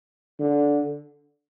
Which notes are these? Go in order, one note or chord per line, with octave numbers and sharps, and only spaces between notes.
D3